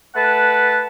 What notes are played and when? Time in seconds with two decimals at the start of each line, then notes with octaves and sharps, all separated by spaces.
0.15 A3 B4 F#5 A5